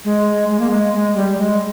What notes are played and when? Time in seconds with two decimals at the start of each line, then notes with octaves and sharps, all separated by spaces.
0.05 G#3
0.50 G#3
0.60 A#3
0.70 G#3
0.94 G#3
1.16 G3
1.38 G#3